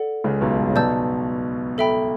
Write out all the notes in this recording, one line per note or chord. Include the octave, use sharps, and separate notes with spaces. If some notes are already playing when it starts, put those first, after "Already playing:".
Already playing: A4 D5 F#5
C#2 C#3
B1 B2
G2
C#3
B1 B2 D5 A5 E6 G6
A4 E5 G5 B5